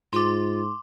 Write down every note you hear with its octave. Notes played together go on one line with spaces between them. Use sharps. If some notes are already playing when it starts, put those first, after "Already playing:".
G#2 F4 C6 D6